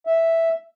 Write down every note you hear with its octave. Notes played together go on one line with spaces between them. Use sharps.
E5